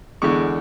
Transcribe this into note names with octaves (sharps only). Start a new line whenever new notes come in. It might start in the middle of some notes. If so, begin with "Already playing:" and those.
E2 D3 G#3 C#6